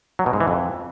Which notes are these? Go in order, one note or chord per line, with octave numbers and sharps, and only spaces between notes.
F#3
B2
G#2
E3
F2